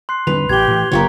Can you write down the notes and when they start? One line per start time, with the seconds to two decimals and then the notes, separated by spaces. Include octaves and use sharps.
0.09 C6 F#6 C7
0.27 D3 G3 C4 B4 F7
0.49 A1 G4 G#6 G7
0.68 A2 E3
0.92 F#1 F#2 C#3 A#3 G4 C#5